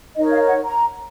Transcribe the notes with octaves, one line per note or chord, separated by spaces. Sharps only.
D#4 A#4 C#5 D#5
F5
F#5
A#5